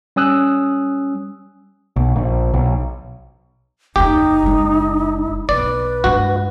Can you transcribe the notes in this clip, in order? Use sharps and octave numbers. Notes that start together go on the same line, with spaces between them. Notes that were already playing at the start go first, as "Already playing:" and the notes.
G3 C#4 G#5 D#6 E6 F#6
B1
A#1
B1
F#1 D#2 D#4 G4
F#1 G#3
D#1 B1 B4 D5
G2 G#3 F#4